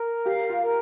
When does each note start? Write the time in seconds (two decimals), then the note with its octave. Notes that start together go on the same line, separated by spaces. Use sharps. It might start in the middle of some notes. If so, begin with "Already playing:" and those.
Already playing: A#4
0.26 G4 F5
0.49 F4
0.62 A#4